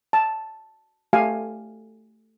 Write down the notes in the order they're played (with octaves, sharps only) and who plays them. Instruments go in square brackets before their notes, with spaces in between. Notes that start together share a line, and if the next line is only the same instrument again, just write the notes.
[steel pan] A5
A3 G4 F5 G#5